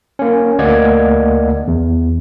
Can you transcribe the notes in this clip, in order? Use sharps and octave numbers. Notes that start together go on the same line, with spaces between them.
A#3 C#4
D2 A#3 D5 D#5 F#5 G#6
E2